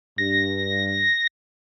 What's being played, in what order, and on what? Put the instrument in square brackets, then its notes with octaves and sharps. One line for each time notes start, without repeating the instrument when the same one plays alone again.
[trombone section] G2 [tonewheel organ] A#6